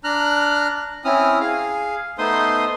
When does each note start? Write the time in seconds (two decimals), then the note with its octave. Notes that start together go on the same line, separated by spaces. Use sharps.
0.04 D4 A#5 F6 F#6
1.05 C4 C#4 E4 D#6 F6
1.41 G#4 F5
2.18 A3 B3 D#4 C5 C6 D#6